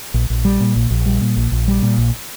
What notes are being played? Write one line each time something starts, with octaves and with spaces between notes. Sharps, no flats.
A#1
A#1
G3
A#2
A#1
A#1
G3
A#2
A#1
A#1
G3
A#2
A#1